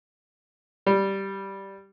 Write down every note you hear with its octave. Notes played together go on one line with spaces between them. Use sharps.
G3